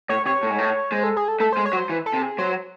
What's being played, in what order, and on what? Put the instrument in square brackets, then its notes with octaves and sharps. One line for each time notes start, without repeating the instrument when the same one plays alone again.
[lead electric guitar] A2 [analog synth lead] C#5
[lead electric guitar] C3 [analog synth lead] C#5
[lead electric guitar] A2
G#2
A2
[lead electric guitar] G#3 [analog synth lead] C5
[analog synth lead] A4
G#4
A4
[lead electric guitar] A3 [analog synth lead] A4
[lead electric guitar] G#3 [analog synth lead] C5
[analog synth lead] C#5
[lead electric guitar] F#3
[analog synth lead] C5
[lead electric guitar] E3
[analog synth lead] A4
[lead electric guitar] C3
[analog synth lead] G#4
[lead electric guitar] F#3 [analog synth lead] C5